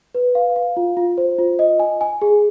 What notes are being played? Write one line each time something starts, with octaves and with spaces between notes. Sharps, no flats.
B4
F5
F5
F4
F4
C5
F4
D#5
G#5
G#5
G#4